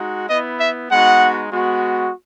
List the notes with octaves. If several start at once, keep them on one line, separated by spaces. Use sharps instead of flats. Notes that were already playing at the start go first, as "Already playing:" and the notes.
Already playing: G#3 D#4 F#4
B3 E4 D#5
E5
G#3 B3 D#4 F#4 F#5
G#3 B3 F#4